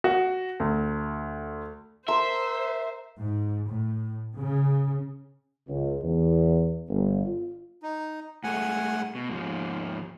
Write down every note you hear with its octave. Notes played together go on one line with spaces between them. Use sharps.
F#4
D2
A#4 C5 E5 C6
G#2
A2
C#3
C#2
E2
G1
F4
D#4
A2 G#3 A3 F#5 G#5
B2
D#2 G#2 F3